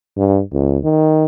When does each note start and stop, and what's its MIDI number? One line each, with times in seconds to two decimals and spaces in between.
0.17 0.40 43
0.53 0.78 37
0.84 1.26 51